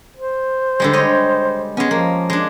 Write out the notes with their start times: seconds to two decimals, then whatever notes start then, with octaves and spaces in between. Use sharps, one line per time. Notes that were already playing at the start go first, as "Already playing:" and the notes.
0.17 C5
0.80 D3 G3 G#3
0.93 C#5 D#5
1.77 G#3 B3 C#4
1.91 F3 A#3
2.30 G#3 D4